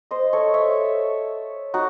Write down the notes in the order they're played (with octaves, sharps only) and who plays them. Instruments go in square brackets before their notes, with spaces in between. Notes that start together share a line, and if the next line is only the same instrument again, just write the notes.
[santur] C5 D#5
A4 C#5
C#5 E5
D#4 F#4